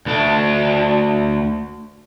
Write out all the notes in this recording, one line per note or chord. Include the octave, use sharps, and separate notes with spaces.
D2 D4